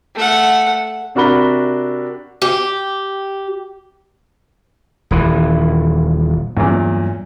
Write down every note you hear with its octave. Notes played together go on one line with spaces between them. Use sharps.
A3 F#5
C3 D4 F#4 A#4 B5 G7
G4
D#1 E3
E2 G2 A#2 F#3